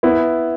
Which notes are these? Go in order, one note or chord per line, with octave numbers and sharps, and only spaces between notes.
B3 E4